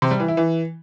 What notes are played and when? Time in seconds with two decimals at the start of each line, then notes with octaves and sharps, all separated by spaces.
0.02 C3
0.11 G3
0.20 E3
0.28 E4
0.37 E3